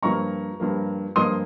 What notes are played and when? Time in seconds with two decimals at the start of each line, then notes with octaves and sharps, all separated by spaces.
0.03 G2 F3 A#3 A#5 C#6
0.60 G2 F3 A#3
1.16 G2 F3 A#3 C6 D#6